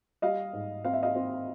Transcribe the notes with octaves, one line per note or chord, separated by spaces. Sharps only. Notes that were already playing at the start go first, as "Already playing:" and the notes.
G3 D#5 F5
G#2
C4 F5
E5
D#5 F5
C4